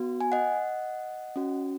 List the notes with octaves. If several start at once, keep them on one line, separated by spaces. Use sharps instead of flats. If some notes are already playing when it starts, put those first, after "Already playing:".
Already playing: B3 F#4
G#5
D#5 F#5
C#4 F#4